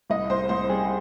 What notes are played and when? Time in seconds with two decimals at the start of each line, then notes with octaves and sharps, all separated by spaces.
0.10 C2 D#5
0.30 C2 C5
0.49 C2 C5
0.69 G3 G#4